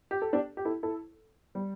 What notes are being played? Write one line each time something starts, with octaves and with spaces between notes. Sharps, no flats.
G4
A4
D4 G4
G4
E4 A4
E4 A4
G3